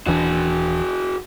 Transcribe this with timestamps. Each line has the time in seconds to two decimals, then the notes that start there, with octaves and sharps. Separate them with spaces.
0.07 D#1 E3 D4 F#4 G#4